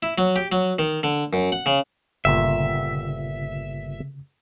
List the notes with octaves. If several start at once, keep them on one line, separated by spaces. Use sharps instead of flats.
E4
F#3
G4
F#3
D#3
D3
F#2
F#5
C#3
G1 A#2 C#3 E5